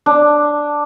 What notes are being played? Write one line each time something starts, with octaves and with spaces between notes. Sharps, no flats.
D4